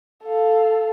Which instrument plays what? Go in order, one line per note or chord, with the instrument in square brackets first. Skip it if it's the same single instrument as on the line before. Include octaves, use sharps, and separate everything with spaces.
[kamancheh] A4 F5